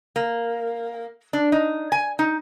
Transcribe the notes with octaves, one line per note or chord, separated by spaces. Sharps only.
A#3
D4
D#4
G#5
D#4